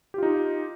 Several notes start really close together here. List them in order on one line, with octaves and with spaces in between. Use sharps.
G4 F4 D#4